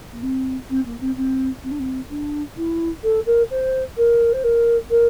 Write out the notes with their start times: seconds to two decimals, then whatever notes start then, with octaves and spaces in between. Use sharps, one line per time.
0.12 A#3
0.22 C4
0.69 C4
0.84 A#3
1.00 C4
1.16 C4
1.63 C4
1.70 D4
1.79 C4
2.09 D4
2.56 E4
3.03 A4
3.26 A#4
3.50 C5
3.97 A#4
4.32 C5
4.43 A#4
4.90 A#4